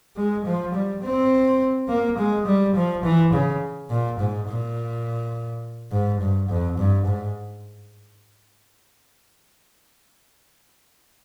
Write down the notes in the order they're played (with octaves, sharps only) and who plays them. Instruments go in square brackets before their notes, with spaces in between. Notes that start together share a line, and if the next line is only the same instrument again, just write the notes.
[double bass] G#3
F3
G3
C4
A#3
G#3
G3
F3
E3
C#3
A#2
G#2
A#2
G#2
G2
F2
G2
G#2